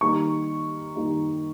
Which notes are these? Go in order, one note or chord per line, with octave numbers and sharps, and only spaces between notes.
D#3 G3 A#3 D#4 C#6
D#3 G3 A#3 D#4